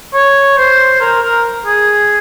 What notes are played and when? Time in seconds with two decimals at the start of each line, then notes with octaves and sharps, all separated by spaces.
0.14 C#5
0.57 C5
1.01 A#4
1.23 A#4
1.66 G#4